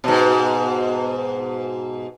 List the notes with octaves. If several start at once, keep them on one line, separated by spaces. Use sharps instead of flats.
G#2 B2